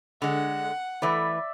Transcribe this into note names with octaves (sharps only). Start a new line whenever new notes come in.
D3 G#3 F#5
E3 A3 B4 D5 E5